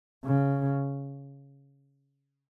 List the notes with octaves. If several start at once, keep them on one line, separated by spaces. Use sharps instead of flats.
C#3